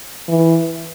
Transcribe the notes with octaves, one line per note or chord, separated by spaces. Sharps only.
E3